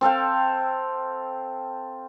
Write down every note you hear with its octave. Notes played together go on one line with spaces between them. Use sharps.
C4 A4 F5 G5